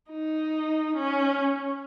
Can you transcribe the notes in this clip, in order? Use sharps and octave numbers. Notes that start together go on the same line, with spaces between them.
D#4
C#4